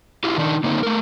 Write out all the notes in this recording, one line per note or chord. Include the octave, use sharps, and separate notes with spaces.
E4 F4 G4
D#3 D4 D#4
D3 A#3 C4 D#4
A3 A#4